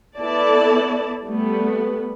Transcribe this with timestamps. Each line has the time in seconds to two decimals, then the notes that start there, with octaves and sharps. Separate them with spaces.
0.18 B3 E4 A4 D5 A5
1.25 G3 A3 B3